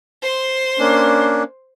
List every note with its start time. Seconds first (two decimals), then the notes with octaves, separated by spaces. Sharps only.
0.22 C5 C6
0.79 A#3 C#4 D4